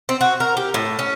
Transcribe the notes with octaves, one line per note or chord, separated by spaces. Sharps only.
C4
F#4
A#4
G4
A2
C#4